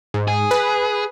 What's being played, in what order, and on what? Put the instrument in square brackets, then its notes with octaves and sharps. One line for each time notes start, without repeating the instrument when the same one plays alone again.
[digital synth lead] G#2
[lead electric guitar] G#4
[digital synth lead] B4